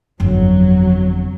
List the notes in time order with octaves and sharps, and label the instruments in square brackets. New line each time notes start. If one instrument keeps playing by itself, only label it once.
[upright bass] G1 F2 [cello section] F#3